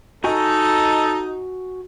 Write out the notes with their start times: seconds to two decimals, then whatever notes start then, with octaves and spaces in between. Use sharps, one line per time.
0.24 D#4 F#4 A4 D#5 G#5